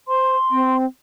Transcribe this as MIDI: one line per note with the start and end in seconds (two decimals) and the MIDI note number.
0.08 0.36 72
0.08 0.77 84
0.51 0.85 60